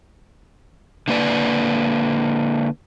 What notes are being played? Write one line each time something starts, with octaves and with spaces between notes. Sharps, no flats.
D3 A#3 B4 D5